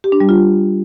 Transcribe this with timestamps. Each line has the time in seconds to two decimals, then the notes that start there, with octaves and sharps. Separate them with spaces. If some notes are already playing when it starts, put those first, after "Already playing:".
0.04 G4
0.12 D4
0.20 G3
0.29 F4